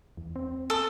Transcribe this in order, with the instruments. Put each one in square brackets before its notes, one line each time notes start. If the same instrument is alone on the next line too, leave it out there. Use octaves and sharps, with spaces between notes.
[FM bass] E2
C4
[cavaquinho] A4